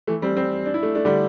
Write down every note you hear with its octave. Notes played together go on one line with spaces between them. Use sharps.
E3 A3
G3 C4
G3 C4
D4
E4
A3 D4
A3 D4
D3 G3